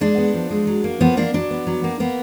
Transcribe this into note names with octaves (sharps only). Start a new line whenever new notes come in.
G#3 D4
B3
F3
G#3
F#3
A#3
F3 B3
A#3 D4
F#3 D4
B3
F#3
A#3
A#3 B3